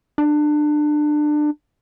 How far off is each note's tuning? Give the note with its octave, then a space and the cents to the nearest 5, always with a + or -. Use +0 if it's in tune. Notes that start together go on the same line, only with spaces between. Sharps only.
D4 +25